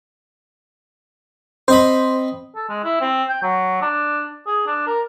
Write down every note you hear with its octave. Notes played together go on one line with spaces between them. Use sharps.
C4 C5 D#5 B5
A4
G#3
E4
C4
G5
F#3
D4
G#4
D4
A#4